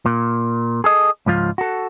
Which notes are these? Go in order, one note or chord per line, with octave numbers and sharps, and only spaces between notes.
A#2
G#4 A4 D#5
C#2 G#2 F3 F4
F#4 A4